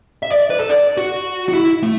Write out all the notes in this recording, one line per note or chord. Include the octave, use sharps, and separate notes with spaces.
E5
D5
B4
A4
D5
F#4
F#4
E4
A3